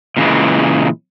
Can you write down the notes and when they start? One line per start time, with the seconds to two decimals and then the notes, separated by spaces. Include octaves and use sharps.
0.17 A#2 C#3 E3 G#3